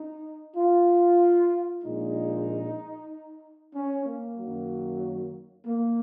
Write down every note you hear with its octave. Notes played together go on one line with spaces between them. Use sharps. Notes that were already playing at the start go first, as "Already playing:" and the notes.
Already playing: D#4
F4
A#1 A#2 G#3 D#4
C#4
A#3
F#2 D#3 F#3
A#3